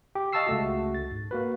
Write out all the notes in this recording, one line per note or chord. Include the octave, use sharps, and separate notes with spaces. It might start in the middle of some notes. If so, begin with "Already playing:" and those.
G4 G5
D#5 F5 A5 C#6 E6 C7
C#2 A3 F#4
A6
G#2
A#3 F#4 B4